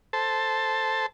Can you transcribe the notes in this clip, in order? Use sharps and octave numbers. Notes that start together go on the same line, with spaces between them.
A4 C5 A5